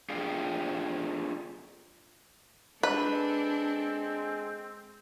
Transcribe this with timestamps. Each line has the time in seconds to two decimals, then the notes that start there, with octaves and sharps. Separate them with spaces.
0.09 D4 F4 G4 G#4 F5
2.83 G#3 C4 D4 A4 B4